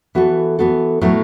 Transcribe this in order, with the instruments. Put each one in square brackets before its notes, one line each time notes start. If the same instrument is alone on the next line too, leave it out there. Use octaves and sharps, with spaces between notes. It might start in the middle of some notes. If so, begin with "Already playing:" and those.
[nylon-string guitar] E3 B3 F#4 A4
E3 B3 F#4 A4
A2 F#3 B3 E4 A4